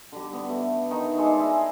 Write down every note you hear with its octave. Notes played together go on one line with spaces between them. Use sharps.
D3 G3
B3
A3
D#3 D#4
G#3 A4 C5 D5
E4 G#4 A#4 A#5